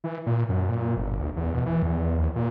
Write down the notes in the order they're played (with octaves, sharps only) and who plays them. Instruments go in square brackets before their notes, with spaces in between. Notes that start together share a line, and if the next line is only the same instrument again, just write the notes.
[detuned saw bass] E3
A#2
F#2
A#2
G1
D2
E2
B2
E3
E2
D#2
A#2